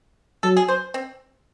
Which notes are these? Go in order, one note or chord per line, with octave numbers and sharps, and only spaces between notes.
F#3 A4
G#4
C5
C4